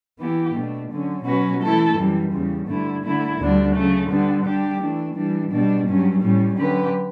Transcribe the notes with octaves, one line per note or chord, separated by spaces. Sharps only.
E3 B3 E4 G4
B2 A3 D4
D3 F#3 C#4
B2 F#3 C#4 F#4 B4
E3 A3 E4 A4
F#2 E3 G3
E2 C#3 G3
G2 D3 A3 E4
D3 A3 E4
D2 D3 G3 D4
C#3 F#3 A3
D3 G3 B3 D4
D3 G3 D4 G4
E3 A3 D4
E3 G3 D4
B2 G3 D4
G2 F#3 C#4
A2 G3 C#4
D3 F#3 C#4 G4 B4